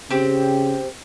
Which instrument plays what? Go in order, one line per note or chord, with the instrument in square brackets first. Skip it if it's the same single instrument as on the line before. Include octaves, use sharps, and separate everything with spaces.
[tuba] C#3 [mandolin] C4 G4